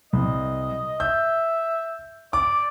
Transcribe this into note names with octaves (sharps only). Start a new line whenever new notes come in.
C2 D#5
E5 G6
D5 D6